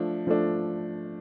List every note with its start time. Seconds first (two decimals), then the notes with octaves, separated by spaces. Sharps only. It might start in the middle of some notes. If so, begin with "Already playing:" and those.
Already playing: F3 A3 D4
0.27 F3 A3 D4